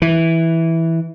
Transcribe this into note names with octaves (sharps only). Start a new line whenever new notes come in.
E3